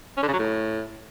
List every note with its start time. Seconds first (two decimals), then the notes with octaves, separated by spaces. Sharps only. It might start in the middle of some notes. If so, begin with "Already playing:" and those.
0.17 C#4
0.23 D3
0.28 C#3
0.33 F#3
0.39 A2